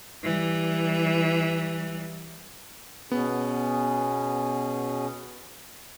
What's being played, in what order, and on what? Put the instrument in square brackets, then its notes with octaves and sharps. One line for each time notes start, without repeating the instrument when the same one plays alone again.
[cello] E3 G3
[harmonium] B2 C#4 G#4 [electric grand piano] B3